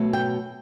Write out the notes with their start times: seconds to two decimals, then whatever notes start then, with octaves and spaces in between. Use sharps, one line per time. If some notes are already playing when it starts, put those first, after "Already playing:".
Already playing: B2 F#3 A3
0.13 G5